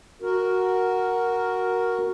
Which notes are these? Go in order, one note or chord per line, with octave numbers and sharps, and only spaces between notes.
F#4 A#4